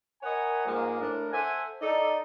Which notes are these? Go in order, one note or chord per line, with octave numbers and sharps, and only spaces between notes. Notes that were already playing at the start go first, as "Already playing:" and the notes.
A#4 C#5 D#5 F#5 G#5 B5
G#2 F3 G#3 A#3
A2 D4 A#4
A4 C5 E5 F#5 G#5
D#4 A4 D5